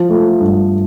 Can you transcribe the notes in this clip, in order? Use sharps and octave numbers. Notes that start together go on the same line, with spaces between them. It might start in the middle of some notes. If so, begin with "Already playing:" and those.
Already playing: F3
A3
G2